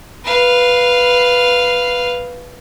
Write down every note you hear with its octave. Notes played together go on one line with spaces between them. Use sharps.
B4 F5